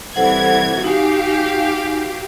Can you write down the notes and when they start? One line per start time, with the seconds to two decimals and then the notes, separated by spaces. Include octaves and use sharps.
0.16 C2 E3 A4 C5 F#5 G#6
0.84 D#4 F#4 G4 F5 G#5